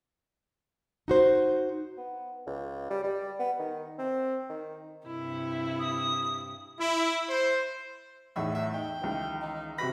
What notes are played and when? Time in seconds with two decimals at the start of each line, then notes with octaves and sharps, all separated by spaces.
1.08 D#4 F#4 C5
1.97 B3
2.46 C#2
2.91 G3
3.04 G3
3.39 B3
3.59 D#3
3.99 C4
4.50 D#3
5.06 G2 C3 E4
5.79 D#6
6.80 E4
7.30 C5
8.36 E2 A2 D#4 E5
8.55 E5
8.74 D#4 G5
9.01 C#2 D#3 E3
9.42 D#4
9.78 C3 F#4 B5 A#6